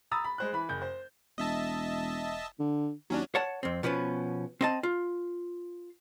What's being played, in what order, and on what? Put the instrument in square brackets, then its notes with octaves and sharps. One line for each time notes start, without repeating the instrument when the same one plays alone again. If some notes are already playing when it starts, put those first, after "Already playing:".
[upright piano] A#5 B5 D#6 E6 A6
B5
G#3 C5 F#6
E3 B5
F#1 G6
C5
[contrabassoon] E1 [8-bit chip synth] D#5 E5 A5
[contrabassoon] D3
[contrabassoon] D#2 [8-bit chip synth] F#3 C#4 D4
[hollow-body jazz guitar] C#5 F#5 A5
F2 C4
B2 F3 B3 C#4 B4
C4 D#5 A5
F4